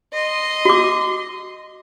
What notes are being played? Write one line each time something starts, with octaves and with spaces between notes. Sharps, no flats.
D#5 C6
F#4 D6